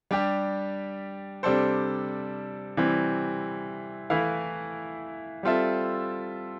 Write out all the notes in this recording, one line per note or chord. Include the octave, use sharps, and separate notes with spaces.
G3 D4 G4
C3 G3 D4 A4 C5
C3 E3 G3 C4 E4
E3 A3 E4 B4 F5
G3 C4 F4 A4 E5